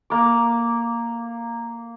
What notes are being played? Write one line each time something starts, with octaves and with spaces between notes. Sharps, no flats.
A#3 D6